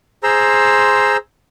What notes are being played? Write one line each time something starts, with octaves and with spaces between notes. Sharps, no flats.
G#4 C5 A#5 C6 E6